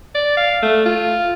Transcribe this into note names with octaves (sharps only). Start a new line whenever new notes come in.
D5
F5
A3
F4